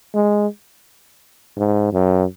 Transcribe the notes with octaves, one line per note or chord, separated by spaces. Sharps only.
G#3
G#2
F#2